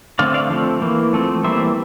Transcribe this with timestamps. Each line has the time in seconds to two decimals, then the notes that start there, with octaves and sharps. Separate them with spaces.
0.19 D3 A3 C4 D5 F5
0.34 D5 F5
0.51 F3 A3 C4
0.81 E3 A#3
1.13 F3 A3 C4
1.44 E3 G3 A#3 C5 E5